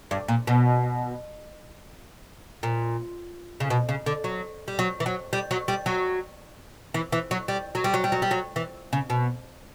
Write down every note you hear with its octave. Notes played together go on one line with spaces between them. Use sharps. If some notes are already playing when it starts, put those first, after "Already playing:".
G2
A#2
B2
A#2
C#3
B2
C#3
D3
F#3
G3
F#3
E3
F#3
G3
F#3
G3
F#3
E3
E3
F#3
G3
F#3
G3
F#3
G3
F#3
G3
F#3
E3
C#3
B2